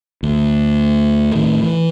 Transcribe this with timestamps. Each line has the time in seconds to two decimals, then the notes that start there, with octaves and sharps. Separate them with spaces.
0.23 D2
1.35 A2 D#3
1.63 E3